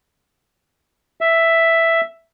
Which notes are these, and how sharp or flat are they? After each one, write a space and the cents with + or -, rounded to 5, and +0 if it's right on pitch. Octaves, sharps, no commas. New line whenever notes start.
E5 +5